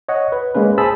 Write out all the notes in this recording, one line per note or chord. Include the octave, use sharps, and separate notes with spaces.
C#5 D#5 F#5
B4
G#3 A#3 C#4 B4
G#4 C5 A5 B5 E6